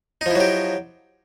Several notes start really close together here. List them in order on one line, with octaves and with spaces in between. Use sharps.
D#4 F3 E4 F#3 G4